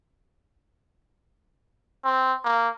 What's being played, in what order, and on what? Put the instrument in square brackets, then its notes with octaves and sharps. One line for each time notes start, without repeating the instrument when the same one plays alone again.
[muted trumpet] C4
A#3